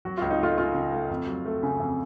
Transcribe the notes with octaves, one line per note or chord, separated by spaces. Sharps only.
F#3 F#4
C#2 F4
D#4
A3 F4
C#3 F4
C#3
A3
F2
F#3
A3
C#3
F2